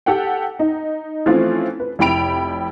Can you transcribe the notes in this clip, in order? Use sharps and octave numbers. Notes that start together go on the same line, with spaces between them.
G4 A4 F#5 G5
D#4
E3 F3 A3 C4 C#4 F4
B4
F1 E4 G5 B5 D7 F7